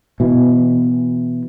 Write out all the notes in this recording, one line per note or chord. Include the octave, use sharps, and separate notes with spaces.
B2 E3